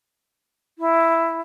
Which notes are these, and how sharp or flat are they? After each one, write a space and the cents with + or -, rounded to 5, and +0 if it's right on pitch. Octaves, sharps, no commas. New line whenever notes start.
E4 +5